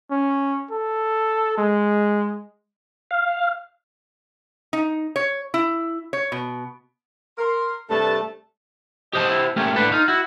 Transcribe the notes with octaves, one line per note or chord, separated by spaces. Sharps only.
C#4
A4
G#3
F5
D#4
C#5
E4
C#5
B2
A#4 C6
G2 C3 A3 B4 D5 A5
G4 C5 D#5 A5
E4
A3 A#3 C#4 G4
A2 D4 A4 B4
D#4 F4
E4 F#4